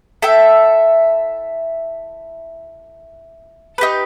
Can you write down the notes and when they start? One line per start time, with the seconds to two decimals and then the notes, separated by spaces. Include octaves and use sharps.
0.22 E4 A4 E5 G5
3.78 D#4 G4 B4